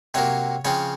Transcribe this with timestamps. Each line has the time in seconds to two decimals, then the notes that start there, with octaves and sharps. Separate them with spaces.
0.14 C3 F#3 A#3 C#5
0.65 C#3 F3 C4 C#5